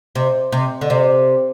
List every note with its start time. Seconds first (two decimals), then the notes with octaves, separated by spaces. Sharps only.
0.15 C3
0.52 C3
0.81 D3
0.90 C3